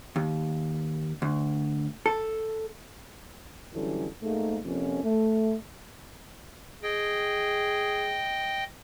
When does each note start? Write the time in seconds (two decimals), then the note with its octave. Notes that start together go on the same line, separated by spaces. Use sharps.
0.16 D#2
1.22 D2
2.06 A4
3.73 D3 E3 F#3 G3 C#4 A4
4.23 G#2 A3 A#3
4.64 F2 C3 F3 A#3 C#4
5.04 A3
6.83 G#4 D#5 G5